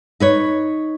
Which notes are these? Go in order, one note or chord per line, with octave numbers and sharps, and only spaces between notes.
D#4 B4 C#5